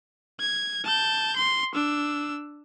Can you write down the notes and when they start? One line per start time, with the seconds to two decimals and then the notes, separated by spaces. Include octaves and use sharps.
0.40 G#6
0.84 A5 G6
1.36 C6
1.75 D4 E6